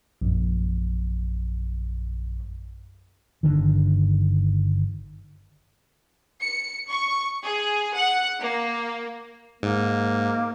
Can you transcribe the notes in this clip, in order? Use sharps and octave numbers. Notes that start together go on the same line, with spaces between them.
A#1 F#2
G1 D2 D3 D#3
C#7
C#6
G#4
F#5
A#3
G#2 A#3